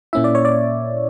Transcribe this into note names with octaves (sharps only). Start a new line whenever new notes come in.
A#2 A#3 C#4 E4 E5
D5
C#5
D5